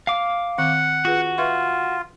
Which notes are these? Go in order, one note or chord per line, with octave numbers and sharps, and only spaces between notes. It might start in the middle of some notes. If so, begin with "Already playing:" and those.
F5 D6
D#3 C4 F#5
F4 F#4 G#4 B4
F4 B4 E5 C#6